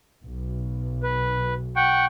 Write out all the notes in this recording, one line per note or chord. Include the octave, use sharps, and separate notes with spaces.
B1
B4
F#5 G5 C#6